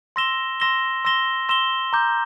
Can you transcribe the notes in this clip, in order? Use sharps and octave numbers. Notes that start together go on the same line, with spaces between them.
C6 E6 A#6 E7 G7
C6 E6 A#6 E7 G7
C6 E6 A#6 E7 G7
C6 E6 A#6 E7 G7
A#5 D6 G6